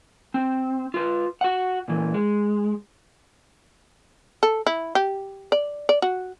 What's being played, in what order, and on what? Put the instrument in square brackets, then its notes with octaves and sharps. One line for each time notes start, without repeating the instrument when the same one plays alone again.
[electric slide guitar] C4
F4 B4
F#4 F#5
A#2 E3
G#3
[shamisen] A4
E4
G4
D5
D5
F#4